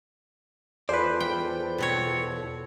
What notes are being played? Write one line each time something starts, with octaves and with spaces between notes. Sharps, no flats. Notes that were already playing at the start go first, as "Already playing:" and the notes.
E2 F4 G#4 A4 B4 C5 D5
G5
B2 C4 C#5